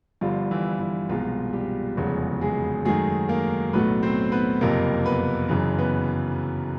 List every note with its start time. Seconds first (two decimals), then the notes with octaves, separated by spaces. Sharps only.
0.21 G1 G2 D3 F3 G3 F4
0.51 E3 E4
0.80 E3 E4
1.09 C2 B2 F3 G#3 F4
1.53 G3 G4
1.97 F1 E2 C#3 F3 F#3 G#3 F#4
2.41 G#3 G#4
2.85 F#2 D#3 F#3 G#3 A3 G#4
3.29 A#3 A#4
3.73 B1 A2 F#3 A3 B3 B4
4.02 C4 C5
4.32 B3 B4
4.61 F#1 F2 C3 A#3 A#4
5.05 B3 B4
5.49 F#1 F#2 C#3 E3
5.79 B3 B4